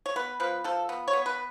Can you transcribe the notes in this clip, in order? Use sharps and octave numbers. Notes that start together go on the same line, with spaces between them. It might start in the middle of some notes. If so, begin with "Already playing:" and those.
C#5
B3 B4
F3 B4
F3 A4
B3
C#5
B3
B4